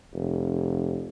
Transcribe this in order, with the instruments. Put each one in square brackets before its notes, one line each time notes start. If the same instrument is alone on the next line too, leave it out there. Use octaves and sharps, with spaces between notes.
[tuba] F1